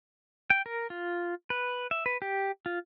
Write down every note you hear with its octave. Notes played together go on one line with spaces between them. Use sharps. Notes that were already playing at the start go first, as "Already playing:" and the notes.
G5
A#4
F4
B4
E5
B4
G4
F4